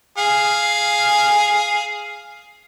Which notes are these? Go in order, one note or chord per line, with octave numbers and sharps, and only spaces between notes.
G#4 F5